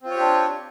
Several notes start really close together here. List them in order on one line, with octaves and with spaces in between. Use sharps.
C4 F4 C#5 G4 D4